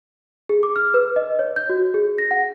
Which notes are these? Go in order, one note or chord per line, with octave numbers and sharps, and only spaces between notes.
G#4
D6
F6
B4
D#5
C#5
G6
F#4
G#4
A#6
F#5